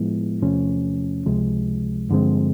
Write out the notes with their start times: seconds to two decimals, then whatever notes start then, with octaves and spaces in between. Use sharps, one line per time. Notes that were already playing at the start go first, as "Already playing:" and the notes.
Already playing: A2 F3 G#3 B3 E4
0.42 E2 C3 F3 A3 C#4
1.26 C#2 C3 F3 G#3
2.10 G2 D3 F3 G#3 C4